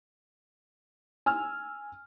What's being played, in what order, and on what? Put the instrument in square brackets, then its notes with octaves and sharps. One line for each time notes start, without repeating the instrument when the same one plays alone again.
[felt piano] G#5 E6 F6